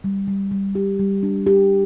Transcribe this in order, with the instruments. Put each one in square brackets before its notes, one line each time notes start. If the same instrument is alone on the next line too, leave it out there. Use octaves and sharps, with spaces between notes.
[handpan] G3
G3
G3
G4
G3
D4
G4